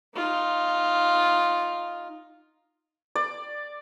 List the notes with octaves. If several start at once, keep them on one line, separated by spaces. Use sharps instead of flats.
D#4 F4
D5